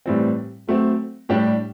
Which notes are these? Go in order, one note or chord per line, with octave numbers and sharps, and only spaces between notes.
A2 E3 G3 C4
F#3 A3 C4
A2 G3 D4 G4